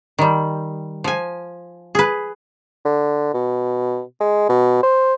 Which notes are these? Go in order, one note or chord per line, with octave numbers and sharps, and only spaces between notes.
D#3 G3
F3 G#5
G#4 B4
D3
B2
G#3
B2
C5